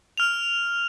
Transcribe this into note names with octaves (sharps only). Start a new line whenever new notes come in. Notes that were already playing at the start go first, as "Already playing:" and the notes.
F6 F7